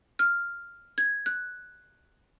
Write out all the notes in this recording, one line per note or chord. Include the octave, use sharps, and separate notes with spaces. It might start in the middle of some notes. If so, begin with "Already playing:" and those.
F6
G#6
F#6